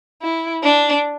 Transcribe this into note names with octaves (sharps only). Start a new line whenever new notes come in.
E4
D4